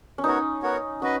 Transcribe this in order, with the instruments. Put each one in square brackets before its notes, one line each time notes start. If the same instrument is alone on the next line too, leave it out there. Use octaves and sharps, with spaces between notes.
[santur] C#4
[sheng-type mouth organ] B3 F#4 A#4 C#5 [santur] D#4
[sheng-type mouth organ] B3 F#4 A#4 C#5
[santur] C#4 [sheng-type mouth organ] F#4 B4 D#5